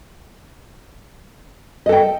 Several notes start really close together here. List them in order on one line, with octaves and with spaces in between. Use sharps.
D#5 A4 G5